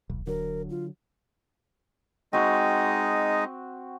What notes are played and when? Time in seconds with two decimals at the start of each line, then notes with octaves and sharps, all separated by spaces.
0.10 D#1 B1
0.27 D3 F#3 A#4
0.70 F4
2.33 G#3 C4 D#4 F#4 D#5